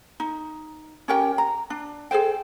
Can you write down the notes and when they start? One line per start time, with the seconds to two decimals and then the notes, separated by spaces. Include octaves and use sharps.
0.20 D#4
1.08 C#4 G4 A#4 G5
1.38 A#5
1.70 D4
2.11 G#4 A4 C5 G5